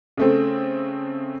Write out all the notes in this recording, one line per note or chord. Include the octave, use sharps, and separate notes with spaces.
C#3 A3 C4